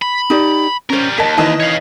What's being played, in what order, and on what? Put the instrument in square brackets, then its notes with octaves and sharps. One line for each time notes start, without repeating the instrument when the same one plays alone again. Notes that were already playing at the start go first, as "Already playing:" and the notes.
[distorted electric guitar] B5
[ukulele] D#4 G4 D5
[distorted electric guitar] G3 A#4 [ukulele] C#4 C5
[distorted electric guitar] D#2 A#2 [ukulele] A#4 D#5 [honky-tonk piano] A5 B6
[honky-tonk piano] D#3 E3 D#5 [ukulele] B4 A5
[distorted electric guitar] C#5 F5